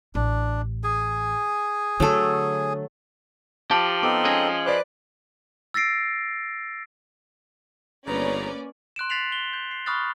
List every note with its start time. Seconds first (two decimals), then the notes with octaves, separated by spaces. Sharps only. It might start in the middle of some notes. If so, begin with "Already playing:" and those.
0.15 A1 D4
0.84 G#4 G#5
2.00 D3 F#3 A3 A4
3.71 F3 G4 A5
4.03 B3 C4 D#4 A4 D6
4.25 C#4 G#4 D#5
4.66 B4 C5 D5 D6 F#6
5.74 E6 A6 A#6 C7 D7
8.07 G1 C#3 A#3 B3 C#4 B4 D5 A#5
8.96 C6 F#6 D7 E7
9.10 A6 B6 C7 F7 F#7
9.32 G7
9.53 G6
9.71 C7
9.86 B5 C#6 D#6 F6 F#6 A6